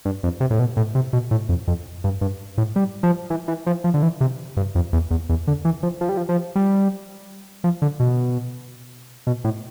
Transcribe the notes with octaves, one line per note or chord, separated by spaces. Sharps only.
G2
F2
C3
A2
B2
A2
C3
B2
A2
F2
F2
G2
G2
A2
G3
F3
E3
E3
F3
F3
D3
E3
C3
G2
F2
E2
E2
E2
D3
E3
F3
F3
G3
F3
F3
G3
F3
D3
B2
B2
A2